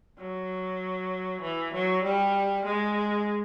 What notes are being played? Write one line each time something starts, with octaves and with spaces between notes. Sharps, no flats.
F#3
E3
F#3
G3
G#3